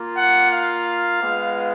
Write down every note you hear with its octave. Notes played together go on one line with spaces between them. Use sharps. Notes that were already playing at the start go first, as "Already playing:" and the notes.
Already playing: A#3 F4
F#5
F5
G#3 B3 F4